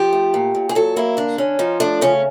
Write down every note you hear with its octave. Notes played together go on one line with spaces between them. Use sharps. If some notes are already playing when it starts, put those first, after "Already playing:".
Already playing: F3 G4
A3
A#2
A#2
G#4
F#3 A4
A#3 E4
D3 D4
C#4
F3 D#4
A3 D4
C#3 C#4